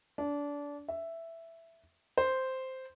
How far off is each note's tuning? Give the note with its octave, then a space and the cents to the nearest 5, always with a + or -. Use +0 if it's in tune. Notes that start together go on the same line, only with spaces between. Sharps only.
D4 -25
E5 +5
C5 -5